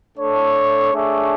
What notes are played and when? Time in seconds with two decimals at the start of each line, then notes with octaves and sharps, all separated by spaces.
0.18 A3 D4 A4 C#5
0.93 A3 D4 G#4 C#5 E5